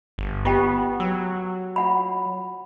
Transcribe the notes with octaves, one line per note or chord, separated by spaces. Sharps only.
G1
B3 F4 G4 G5
F#3 E6
F4 F#5 B5